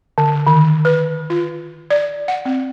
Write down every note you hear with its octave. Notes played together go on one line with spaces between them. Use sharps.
D3
D#3
B4
F4
D5
F#5
C4